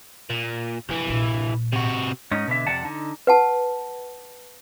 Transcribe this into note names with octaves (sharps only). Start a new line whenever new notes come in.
A#2
C2 E3 F3 A#3
A#1 A#2
C3 F#4
G#2 C#4 D#4
B2 D3 E5
F2 C3 D5 F#5 A5
D3 D#4
B4 F#5 A5